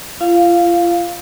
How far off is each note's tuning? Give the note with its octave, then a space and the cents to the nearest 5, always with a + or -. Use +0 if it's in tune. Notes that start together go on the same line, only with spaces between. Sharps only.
F4 -35 F5 +0